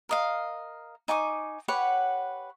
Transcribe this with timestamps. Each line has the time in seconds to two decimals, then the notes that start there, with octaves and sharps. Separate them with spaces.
0.09 A#4 D#5 F5
1.08 D#4 G#5 C#6 D6
1.68 G4 B4 C#5 F#5